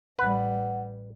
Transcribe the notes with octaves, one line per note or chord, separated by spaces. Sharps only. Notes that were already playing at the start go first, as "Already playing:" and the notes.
A1 G3 B4 F#5